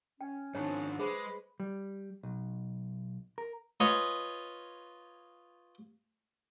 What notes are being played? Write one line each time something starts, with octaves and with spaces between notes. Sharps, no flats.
C#4 G5
G#2 D#3 F3 C#4 D4 C#5 A#5
G#3 G#4 B4 C5 C#6
G3
B1
A#4
F4 B4 C#5 D#5 G#5